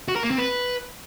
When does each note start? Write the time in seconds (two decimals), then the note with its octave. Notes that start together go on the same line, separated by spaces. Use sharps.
0.08 F#4
0.16 A#4
0.23 A#3
0.31 C4
0.38 B4